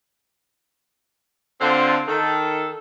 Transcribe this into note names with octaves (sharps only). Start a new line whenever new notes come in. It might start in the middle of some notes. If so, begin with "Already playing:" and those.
D3 C4 F4
D#3 A4